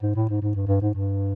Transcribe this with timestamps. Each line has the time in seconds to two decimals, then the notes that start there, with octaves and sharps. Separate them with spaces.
0.02 G#2
0.16 A2
0.29 G#2
0.42 G#2
0.55 G2
0.68 G2
0.82 G#2
0.94 G2